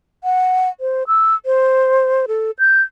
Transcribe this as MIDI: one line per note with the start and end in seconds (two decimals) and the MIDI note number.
0.24 0.69 78
0.80 1.03 72
1.07 1.35 88
1.46 2.26 72
2.28 2.51 69
2.59 2.82 91